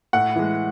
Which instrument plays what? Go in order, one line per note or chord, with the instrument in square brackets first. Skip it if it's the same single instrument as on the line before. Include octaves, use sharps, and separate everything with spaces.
[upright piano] A2 F#5
E3 G#3